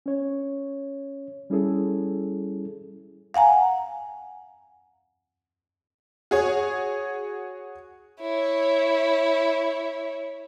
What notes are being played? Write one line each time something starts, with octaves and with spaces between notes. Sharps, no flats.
C#4 C#5
G3 C#4 E4 G#4 A4
F5 F#5 G#5 A#5
F#4 G#4 C#5
E4 C#5